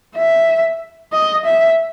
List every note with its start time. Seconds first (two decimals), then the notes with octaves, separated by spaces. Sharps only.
0.16 E5
1.13 D#5
1.45 E5